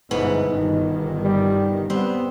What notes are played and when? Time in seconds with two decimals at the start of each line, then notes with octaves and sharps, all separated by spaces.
0.11 G1 G#2 B2 E3 B3
0.49 G1 D#3 D#4
1.24 G3
1.90 G3 B3 C4